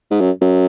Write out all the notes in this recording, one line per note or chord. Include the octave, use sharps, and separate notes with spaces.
G#2
F#2
F#2